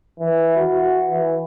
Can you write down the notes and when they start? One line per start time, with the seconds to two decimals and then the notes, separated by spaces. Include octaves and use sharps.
0.19 E3
0.57 F#4
1.10 E3